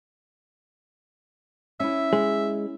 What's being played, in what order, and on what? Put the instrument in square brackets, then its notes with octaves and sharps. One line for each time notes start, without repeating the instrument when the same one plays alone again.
[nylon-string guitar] C#4 E4 [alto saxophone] E5
[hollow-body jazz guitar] G#3